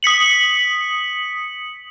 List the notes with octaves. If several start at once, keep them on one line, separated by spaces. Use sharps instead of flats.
D#6 B6 C#7 F#7